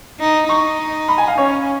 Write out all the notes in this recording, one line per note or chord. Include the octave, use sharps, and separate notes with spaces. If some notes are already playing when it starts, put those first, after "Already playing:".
D#4
D#4 C#6
B5
G#5
F5
C#4 C#5